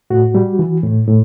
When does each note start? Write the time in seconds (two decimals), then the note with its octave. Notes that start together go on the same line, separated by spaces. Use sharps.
0.10 A2 F#4
0.35 G3
0.59 E3
0.83 A2
1.08 A2